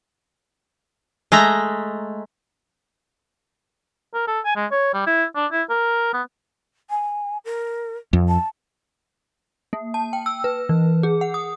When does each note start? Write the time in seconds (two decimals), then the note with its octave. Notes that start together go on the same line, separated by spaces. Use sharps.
1.32 G#3 A3 A#5
4.14 A#4
4.27 A4
4.45 G#5
4.56 G#3
4.72 C#5
4.94 G3
5.06 E4
5.35 D4
5.52 E4
5.70 A#4
6.13 B3
6.90 G#5
7.45 A#4
8.13 F2
8.28 A5
9.73 A#3
9.94 A5
10.13 G5
10.26 E6
10.44 B4
10.69 E3
11.03 G#4
11.21 F#5
11.34 D#6